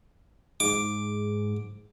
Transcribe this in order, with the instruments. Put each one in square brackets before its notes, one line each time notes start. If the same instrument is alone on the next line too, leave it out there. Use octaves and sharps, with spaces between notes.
[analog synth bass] G#2 [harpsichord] D6